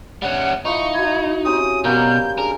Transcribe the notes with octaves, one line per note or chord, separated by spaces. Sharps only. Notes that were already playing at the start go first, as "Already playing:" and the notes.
G3 C#4 F#5
F3 D#4 E4 C#6 D6
E4 F#4 G#6
C4 C#4 G4 D#6
B2 F#3 G3 A#3 G6
D4 G#4 A#4